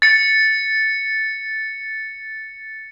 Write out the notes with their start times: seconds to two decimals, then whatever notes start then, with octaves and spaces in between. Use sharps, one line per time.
0.02 A6 C#7